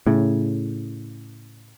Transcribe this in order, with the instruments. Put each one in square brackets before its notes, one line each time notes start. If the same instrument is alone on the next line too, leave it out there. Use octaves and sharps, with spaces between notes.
[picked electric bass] A2 C#3